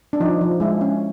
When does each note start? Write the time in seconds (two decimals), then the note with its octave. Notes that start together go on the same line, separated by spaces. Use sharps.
0.13 D4
0.20 F3 D#4
0.41 F3
0.60 G#3 E4
0.81 C#4